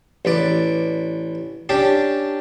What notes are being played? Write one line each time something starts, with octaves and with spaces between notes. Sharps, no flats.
A1 B4 D5
C#4 D4 G4 A5